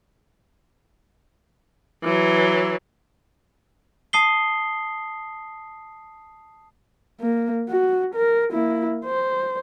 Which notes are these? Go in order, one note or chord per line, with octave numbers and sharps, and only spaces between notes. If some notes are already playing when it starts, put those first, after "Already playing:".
E3 F#3
A5 D#6 C7 G7
A#3
F#4
A#4
A#3 E4
C5